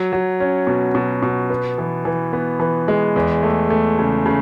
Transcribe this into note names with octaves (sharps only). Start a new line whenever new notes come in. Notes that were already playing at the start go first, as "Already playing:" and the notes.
Already playing: F#3
F#3
C#4
B2
B2
B2
B3
E3
E3
B3
E3
G#3
E2
A3
A3
C#3
C#3